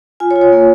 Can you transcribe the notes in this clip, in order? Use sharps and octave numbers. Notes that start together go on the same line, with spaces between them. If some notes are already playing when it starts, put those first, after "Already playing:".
F4 G#5
C#5
F4
C#5
A#3